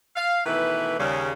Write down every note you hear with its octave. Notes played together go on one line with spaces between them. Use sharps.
F5
B2 D#3 E3 A3 E4 B4
D#2 C#3 G3